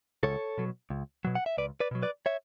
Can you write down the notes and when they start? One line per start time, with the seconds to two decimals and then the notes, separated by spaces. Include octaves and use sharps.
0.23 C#2 A4 C#5
0.58 B2 F#3
0.90 C#2
1.25 B2 F#3
1.35 F#5
1.46 E5
1.58 C#2 B4 D5
1.80 B4 D5
1.91 B2 F#3
2.03 B4 D5
2.26 C#5 E5